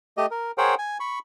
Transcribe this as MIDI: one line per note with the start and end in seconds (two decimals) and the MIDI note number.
0.17 0.26 57
0.17 0.26 67
0.17 0.26 75
0.31 0.51 70
0.58 0.75 68
0.58 0.75 70
0.58 0.75 72
0.58 0.75 73
0.58 0.75 78
0.58 0.75 79
0.79 0.98 80
1.00 1.19 83
1.00 1.19 85